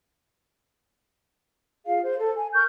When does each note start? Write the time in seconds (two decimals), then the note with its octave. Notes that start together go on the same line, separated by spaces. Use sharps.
1.85 F4 G#4 F5
2.02 C5
2.19 A4
2.34 G#5
2.53 A#4 C#6 F6 G6